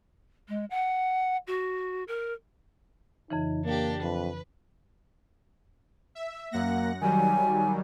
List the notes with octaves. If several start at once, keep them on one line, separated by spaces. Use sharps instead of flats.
G#3
F#5
F#4
A#4
F2 C#3 E3 D#4
A#3 D4 G4
F2 B4
E5
F#2 A#3 F#5 A#6
D#3 F#3 G3 G#5